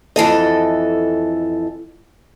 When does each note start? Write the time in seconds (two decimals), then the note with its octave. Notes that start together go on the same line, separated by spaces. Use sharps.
0.16 F2 E3 A4 D#5